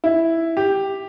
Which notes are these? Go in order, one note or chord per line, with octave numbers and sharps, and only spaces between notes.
E4
G4